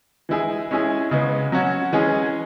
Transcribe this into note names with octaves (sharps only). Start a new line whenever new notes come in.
E3 G#3 E4 G#4
G#3 C#4 E4 G#4
C#3 G#3 B3
F#3 C#4 F#4
E3 G#3 C#4 G#4